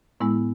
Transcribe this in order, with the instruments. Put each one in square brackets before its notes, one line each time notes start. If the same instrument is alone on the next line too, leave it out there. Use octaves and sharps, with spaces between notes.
[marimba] A2 G#3 B3 E4